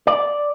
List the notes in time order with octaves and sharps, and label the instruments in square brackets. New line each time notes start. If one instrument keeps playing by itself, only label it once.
[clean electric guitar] D5